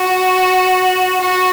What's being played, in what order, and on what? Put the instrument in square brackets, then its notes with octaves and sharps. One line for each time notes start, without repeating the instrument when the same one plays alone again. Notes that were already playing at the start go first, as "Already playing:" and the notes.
Already playing: [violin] F#4
F#4